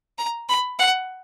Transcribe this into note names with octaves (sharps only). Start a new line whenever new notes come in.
A#5
B5
F#5